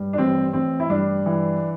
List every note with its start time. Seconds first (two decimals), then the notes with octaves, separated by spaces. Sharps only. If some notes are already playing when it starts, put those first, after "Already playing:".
Already playing: G2
0.13 D4
0.18 A1 C4
0.53 A1 C4
0.80 E4
0.90 G2 D4
1.26 E3